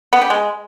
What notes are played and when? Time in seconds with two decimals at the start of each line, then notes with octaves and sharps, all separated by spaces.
0.13 B3
0.21 G4
0.30 G#3